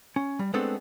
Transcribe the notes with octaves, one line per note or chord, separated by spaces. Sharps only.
C#4
G3
G#3 A3 B3 C4 D4 A4